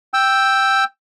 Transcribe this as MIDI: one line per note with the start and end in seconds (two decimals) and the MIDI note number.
0.14 0.84 79
0.14 0.84 88